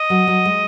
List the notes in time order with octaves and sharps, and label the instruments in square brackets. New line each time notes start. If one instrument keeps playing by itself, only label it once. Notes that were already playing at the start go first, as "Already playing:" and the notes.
Already playing: [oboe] D#5
[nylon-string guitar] F#3
F#3
G#3